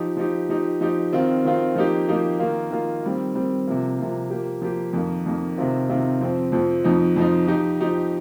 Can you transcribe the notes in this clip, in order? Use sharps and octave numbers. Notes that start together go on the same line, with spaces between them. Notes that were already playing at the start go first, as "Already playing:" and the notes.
Already playing: F3 D#4 G4
F3 D#4 G4
F3 D#4 G4
F3 D#4 G4
D#3 C4 F4
D#3 C4 F4
F3 A#3 D#4 G4
F3 A#3 D#4 G4
D#3 A#3 F4
D#3 A#3 F4
D#3 G3 C4
D#3 G3 C4
C3 F3 A#3
C3 F3 A#3
F3 A#3 G4
F3 A#3 G4
F2 D#3 A#3
F2 D#3 A#3
C3 D#3 C4 F4
C3 D#3 C4 F4
F2 F3 C4
F2 F3 C4
F2 F3 D#4
F2 F3 D#4
F3 D#4 G4
F3 D#4 G4